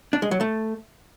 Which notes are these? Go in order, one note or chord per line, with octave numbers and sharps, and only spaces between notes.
D4
G#3
F#3
A3